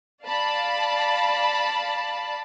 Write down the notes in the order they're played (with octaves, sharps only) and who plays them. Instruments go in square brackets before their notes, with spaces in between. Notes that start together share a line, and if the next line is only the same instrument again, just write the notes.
[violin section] D5 F5 A5 B5